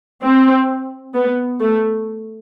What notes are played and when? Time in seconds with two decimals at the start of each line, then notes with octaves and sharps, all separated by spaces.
0.22 C4
1.14 B3
1.60 A3